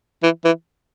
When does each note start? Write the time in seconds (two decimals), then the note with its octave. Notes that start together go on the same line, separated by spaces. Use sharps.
0.23 E3
0.44 E3